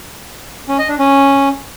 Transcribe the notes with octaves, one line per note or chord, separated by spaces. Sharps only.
C#4
D#5
D4
C#4